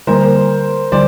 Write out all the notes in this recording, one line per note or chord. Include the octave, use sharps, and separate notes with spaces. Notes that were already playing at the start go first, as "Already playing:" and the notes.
D3 G3 A#3 A#4 C5
D3 G3 C5 D5